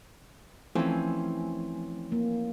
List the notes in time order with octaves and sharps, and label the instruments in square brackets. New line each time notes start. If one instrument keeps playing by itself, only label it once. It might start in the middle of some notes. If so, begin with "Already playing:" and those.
[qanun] E3 [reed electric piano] F3 A3 G#5 [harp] C4 C#4
[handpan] A#3